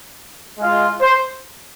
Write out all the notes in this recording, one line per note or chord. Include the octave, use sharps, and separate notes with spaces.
G#3 F4
C5